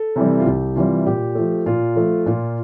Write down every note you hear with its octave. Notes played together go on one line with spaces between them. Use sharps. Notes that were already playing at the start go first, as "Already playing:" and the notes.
Already playing: A4
C3 E3 G3
F4
C2 G4
C3 E3 G3 F4
A#2 G4
F3 A3
A#2 F4
F3 A3
A#2 F4